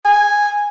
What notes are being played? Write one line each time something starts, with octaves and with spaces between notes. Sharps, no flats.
G#5